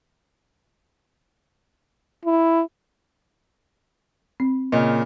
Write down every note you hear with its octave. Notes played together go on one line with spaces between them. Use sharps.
E4
C4
A#2 C#3 D#5